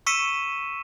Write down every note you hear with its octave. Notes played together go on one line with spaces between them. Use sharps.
C#6 E6 B6 C#7 D#7 E7